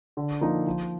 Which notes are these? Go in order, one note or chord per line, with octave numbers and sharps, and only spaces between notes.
D3
F3 A#3 D#4
F3